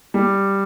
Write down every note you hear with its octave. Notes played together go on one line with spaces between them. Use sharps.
G3